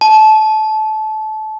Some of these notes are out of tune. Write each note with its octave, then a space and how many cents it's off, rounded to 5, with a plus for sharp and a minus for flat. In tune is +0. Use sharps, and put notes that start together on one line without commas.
A5 -25